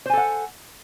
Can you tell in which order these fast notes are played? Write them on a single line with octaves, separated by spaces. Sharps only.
C5 G#5 A4 F#5